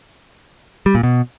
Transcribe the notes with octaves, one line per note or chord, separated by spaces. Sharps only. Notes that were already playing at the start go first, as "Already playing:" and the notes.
G3
A#2
B2